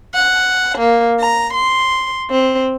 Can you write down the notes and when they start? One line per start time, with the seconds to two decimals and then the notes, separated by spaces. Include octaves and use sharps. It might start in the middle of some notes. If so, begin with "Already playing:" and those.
0.14 F#5
0.78 A#3
1.21 A#5
1.54 C6
2.31 C4